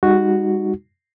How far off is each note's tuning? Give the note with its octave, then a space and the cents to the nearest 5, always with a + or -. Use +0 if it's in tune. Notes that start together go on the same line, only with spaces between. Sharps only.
G3 +45 D#4 +0 F#4 +0